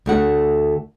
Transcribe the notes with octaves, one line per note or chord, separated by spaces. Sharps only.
D2 A3 F#5